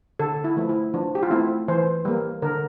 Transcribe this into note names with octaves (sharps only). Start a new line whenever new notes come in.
D3 A4
E4
F3 A3
E4
F3 D4
G4
F4
A3 C4 E4
E3 C5
G3 A#3
D3 A#4